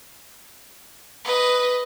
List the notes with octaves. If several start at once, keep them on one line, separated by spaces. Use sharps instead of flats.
B4 D#5